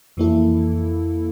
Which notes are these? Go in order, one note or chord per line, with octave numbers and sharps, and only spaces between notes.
F2 E3 A#3 E4 A4